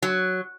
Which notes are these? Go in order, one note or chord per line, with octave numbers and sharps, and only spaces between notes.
F#3